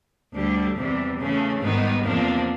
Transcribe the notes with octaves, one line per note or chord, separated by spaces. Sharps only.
D2 D3 G3
E2 C3 E3 G3
C#3 E3 A3 C#4
G#2 D#3 G3 B3 D#4
E2 C3 F3 A#3 D4